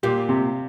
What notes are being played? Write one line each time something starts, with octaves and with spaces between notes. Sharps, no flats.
A#2 G4
C3